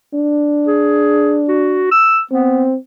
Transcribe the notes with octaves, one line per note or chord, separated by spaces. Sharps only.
D4
G#4
F#4
E6
B3 C4